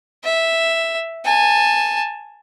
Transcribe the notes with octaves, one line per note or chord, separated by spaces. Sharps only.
E5
G#5 A5